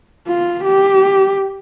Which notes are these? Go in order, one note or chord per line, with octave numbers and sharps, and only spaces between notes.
F4
G4